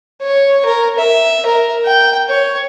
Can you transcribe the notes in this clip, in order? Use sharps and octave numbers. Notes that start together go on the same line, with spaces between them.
C#5
A#4
E5
A#4
G5
C#5